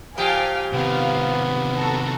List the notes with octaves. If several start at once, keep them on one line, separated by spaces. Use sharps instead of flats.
A#2 F3 G4 F5 G5 G#5
C3 D#3 B3 F5
F#4 A4 A#5